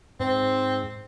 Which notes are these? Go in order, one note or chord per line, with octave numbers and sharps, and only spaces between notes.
G#2 C4